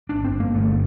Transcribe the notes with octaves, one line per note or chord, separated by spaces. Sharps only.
G1 D4
C4
G2
A#3
G1 A3